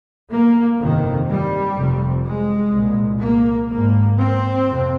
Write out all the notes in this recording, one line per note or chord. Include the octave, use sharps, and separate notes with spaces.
A#3
G1 F2 C3 D#3
G3
F1 F2 C3
G#3
C2 A#2
A#3
G#1 G#2 A#3
C4
F2 C3